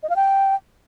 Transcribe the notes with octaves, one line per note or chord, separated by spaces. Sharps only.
D#5
F5
G5